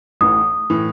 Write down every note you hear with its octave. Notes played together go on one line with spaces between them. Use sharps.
A1 A2 E3 D#6
A2 E3